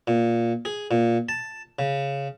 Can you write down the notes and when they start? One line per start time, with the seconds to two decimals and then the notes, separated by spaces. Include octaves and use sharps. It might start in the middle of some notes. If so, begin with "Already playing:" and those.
0.07 A#2
0.65 G#4
0.91 A#2
1.29 A5
1.79 C#3